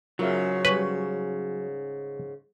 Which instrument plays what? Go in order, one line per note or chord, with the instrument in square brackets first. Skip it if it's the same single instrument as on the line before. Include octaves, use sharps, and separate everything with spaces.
[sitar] G#2 C#3 [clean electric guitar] F#3 [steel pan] F4 A#4 E5
[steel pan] G3 C#5 [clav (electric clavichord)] B4